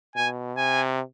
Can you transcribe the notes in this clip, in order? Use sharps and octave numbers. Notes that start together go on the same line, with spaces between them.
B2 G#5
C3 G#5